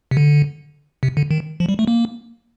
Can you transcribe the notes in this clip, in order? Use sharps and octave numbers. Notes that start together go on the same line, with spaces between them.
C3
D3
C3
D3
D#3
F3
G3
A3
A#3